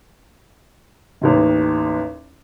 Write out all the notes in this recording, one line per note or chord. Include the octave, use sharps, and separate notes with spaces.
A1 D#2 D#3